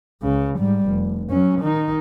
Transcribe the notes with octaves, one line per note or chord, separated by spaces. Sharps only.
C#2 C#3
G#2 G3
F1
F#3 C#4
D#3 D#4